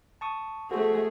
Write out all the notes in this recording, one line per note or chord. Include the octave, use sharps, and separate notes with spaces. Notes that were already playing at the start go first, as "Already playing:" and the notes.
A5 C#6 D#6
A3 F#4 G#4 A4 C5